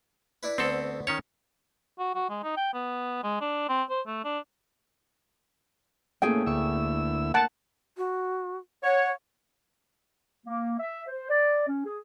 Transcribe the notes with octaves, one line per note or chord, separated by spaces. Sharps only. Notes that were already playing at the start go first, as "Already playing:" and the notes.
D4 E4 B4
D2 B3 C4 A4 C5
D#3 C#4 C#5 A5
F#4
F#4
G#3
D#4
G5
B3
G#3
D4
C4
C5
A3
D4
E2 A2 A3 A#3 C#4 G#4 G5
D2 D4 E4 C#6 E6
A#4 F#5 A5
F#4
C#5 F#5
A#3
E5
C5
D5
C#4
G#4